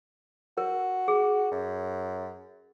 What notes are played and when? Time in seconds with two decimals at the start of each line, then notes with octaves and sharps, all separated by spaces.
0.58 F#4 A#4
1.08 G#4
1.52 F#2